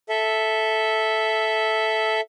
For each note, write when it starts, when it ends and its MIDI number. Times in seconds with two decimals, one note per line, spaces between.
0.09 2.21 69
0.09 2.21 76